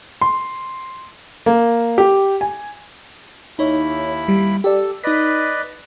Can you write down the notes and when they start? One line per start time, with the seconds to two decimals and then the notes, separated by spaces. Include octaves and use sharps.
0.21 C6
1.46 A#3
1.98 G4
2.41 G#5
3.59 D#2 D#4 E4 C#5 B5
4.28 G3
4.64 G4 A4 D5
5.04 D#4 B4 D5 D#5 B6